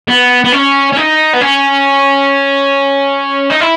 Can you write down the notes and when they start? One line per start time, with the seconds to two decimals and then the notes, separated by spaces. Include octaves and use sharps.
0.08 B3
0.44 B3
0.52 C#4
0.92 C#4
0.97 D#4
1.33 B3
1.41 C#4
3.50 D#4
3.61 E4